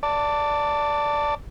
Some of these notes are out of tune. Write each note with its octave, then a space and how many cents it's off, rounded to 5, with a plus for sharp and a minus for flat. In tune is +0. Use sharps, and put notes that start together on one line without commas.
D5 -10 A5 +20